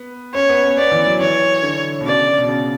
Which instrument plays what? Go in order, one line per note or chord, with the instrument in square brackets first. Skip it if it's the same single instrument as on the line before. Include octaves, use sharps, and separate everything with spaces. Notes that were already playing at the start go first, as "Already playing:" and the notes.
Already playing: [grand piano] B3
[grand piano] C#4 [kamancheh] C#5
[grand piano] B3
C#4
[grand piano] B3 [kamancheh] D5
[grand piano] E3
F#3
[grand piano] E3 [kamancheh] C#5
[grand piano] D3
B2
[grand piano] C#3 [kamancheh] D5
[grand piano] B2
C#3